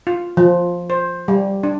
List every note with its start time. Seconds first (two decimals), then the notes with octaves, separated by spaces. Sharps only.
0.07 F4
0.37 F3
0.90 C5
1.28 G3
1.63 D4